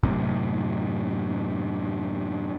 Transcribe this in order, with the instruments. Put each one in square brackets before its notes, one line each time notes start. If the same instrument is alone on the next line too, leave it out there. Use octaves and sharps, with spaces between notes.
[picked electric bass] F#2 A2 C3